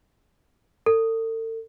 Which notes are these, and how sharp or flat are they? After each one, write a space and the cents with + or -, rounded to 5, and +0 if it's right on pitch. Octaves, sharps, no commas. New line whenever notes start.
A4 +40